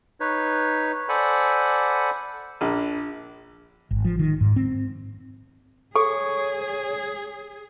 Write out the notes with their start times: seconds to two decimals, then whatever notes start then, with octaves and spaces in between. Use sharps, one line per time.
0.20 D#4 B4 C#5
1.09 A4 C5 D5 F#5 G#5 B5
2.61 A#1
3.91 G#1
4.05 F3
4.19 D#3
4.41 G#2
4.56 C4
5.96 G#4 A4 C#5 C#6